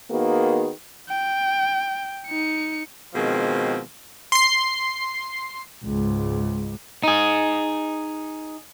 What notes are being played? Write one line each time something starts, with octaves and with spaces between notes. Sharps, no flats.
D#3 A#3 B3 F#4 G#4
G5
D#4 C#7
B2 D#3 F3 G#3 C4
C6 C7
C#2 G#2
D#4 G#4